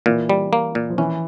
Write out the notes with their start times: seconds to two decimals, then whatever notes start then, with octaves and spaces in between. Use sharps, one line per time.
0.06 A#2 E3
0.29 G3
0.53 A#3
0.75 A#2
0.90 F3
0.98 E3 C#4